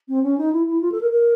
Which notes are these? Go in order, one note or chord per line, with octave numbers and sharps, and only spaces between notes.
C4
C#4
D#4
E4
E4
F4
A4
A#4
A#4